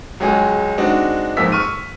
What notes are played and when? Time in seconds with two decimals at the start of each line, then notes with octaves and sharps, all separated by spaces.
0.20 C#2 F#3 G#3 G#4
0.78 G#3 C4 D4 D#4 F#4
1.37 F2 G#2 A#3 E6 B6
1.52 C#6 F6 D#7